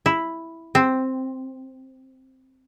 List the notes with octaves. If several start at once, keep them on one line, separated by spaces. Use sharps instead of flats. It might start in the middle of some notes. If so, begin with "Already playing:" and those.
E4
C4